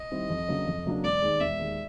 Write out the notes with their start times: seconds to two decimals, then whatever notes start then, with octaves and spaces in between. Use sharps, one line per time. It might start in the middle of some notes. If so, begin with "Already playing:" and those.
Already playing: D#5
0.11 D#3 G3 C4 E4
0.30 F2
0.48 C#3 F#3 A#3 D4
0.67 F2
0.86 C#3 F#3 A#3 D4
1.04 E1 D5
1.22 D#2 D#3 G#3
1.40 E1 E5
1.60 D#2 D#3 G#3